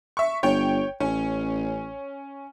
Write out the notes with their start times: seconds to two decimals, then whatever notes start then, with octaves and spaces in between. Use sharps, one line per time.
0.17 E5 C#6
0.43 G1 C#5 G5
1.00 A1 C#4